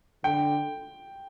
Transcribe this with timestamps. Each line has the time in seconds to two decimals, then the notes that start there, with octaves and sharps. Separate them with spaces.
0.24 D3 G5